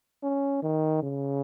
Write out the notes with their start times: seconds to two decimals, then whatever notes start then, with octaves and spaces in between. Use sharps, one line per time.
0.23 C#4
0.63 D#3
1.03 C#3